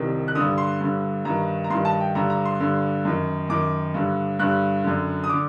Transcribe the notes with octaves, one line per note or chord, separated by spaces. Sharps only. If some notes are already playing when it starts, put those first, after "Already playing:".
Already playing: C2 C3 D#3
F#6
G2 D3 D#6
C6
G2 D3
G2 D#3 A#5
A#5
G2 D#3 C6
A5
G5
G2 D3 A#5
A#5
C6
G2 D3
F#2 D#3
F#2 D#3 D6
G2 D3
G2 D3 F#6
F#2 D3
D#6
D3 D6